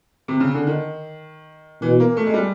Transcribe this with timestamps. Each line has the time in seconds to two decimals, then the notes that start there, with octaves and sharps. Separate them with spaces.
0.28 C3
0.40 C#3
0.54 D3
0.67 D#3
1.82 B2 E3
2.00 A#3
2.17 A3
2.27 G#3
2.34 G3